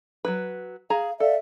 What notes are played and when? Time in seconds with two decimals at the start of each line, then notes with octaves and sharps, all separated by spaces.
0.25 F#3 A#3 B4
0.90 G#4 F5 A#5
1.20 A4 D5 E5 F5